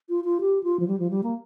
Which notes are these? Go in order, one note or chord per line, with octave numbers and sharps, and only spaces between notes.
F4
F4
G4
F4
F3
G3
F3
G3
A#3